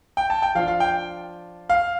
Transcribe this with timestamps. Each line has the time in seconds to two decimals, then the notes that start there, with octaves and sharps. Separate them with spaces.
0.17 G5
0.30 A5
0.42 G5
0.55 F3 D4 F4 F5
0.68 F5
0.80 G5
1.70 F5